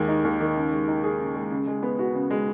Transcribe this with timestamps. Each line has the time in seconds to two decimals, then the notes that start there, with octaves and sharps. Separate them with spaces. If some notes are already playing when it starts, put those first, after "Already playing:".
Already playing: D#2 D#3 G#3
0.08 D#4
0.24 D#2
0.41 D#3
0.56 C#3
0.72 G#3
0.88 D#4
1.04 G#4
1.20 C#3
1.36 G#3
1.52 C#3
1.67 G#3
1.83 B3
1.99 F#4
2.15 C#3
2.31 G#3